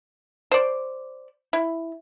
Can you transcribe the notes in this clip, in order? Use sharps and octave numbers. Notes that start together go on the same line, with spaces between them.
C5 D5
E4